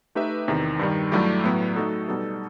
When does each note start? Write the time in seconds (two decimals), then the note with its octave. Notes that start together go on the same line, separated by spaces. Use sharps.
0.15 A3 D#4 G4 B4 E5
0.48 E2 C3 D#3
0.79 G2 D#3 G3
1.12 G2 F#3 A3 E4 G4
1.44 A2 F#3 B3
1.76 F#3 A3 D#4 F#4 A4
2.09 B2 G3 D#4 A4